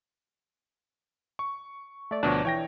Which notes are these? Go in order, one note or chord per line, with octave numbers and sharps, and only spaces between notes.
C#6
A3 D5
D2 B2 F3 D4 C#5
E3 C#5 G5 A#6